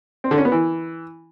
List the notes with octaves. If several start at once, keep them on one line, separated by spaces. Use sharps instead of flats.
C4
D3
C#4
B3
E3